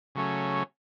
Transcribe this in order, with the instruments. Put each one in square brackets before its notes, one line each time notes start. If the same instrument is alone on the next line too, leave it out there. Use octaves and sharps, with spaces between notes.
[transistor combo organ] C#3 F#3 A3 C#4